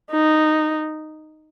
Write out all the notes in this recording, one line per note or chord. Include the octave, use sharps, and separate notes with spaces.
D#4